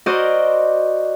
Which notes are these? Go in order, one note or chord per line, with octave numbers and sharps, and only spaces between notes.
F#4 A#4 C5 D5 D#5